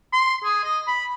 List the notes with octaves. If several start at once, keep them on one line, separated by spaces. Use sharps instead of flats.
C6
G#4
D#5
B5